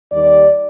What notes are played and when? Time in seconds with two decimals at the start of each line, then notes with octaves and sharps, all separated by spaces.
0.12 D#2 D#3 G3 D5